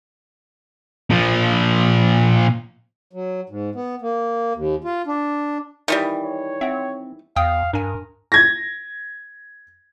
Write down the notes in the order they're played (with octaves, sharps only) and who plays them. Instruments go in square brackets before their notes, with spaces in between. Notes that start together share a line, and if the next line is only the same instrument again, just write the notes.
[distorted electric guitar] A#2 F3
[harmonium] F#3
G#2
B3
A#3
D#2
F4
D4
[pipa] D#3 E3 G3
[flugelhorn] C#5
[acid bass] C4 [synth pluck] E5 F#5
[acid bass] E2 [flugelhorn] F5 [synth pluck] G5 D#6
[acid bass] G2 [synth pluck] D4 G#5 [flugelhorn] A#4
[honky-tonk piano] G#6 A#6